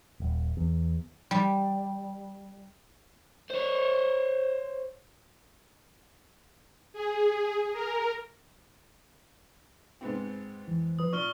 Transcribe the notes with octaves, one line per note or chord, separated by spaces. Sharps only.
D#1
E2
G3
C5 C#5
G#4
A#4
G#2 B3 C4
F2 E3
F3 B4 D#6
A#2 D5 C#6 F6 G7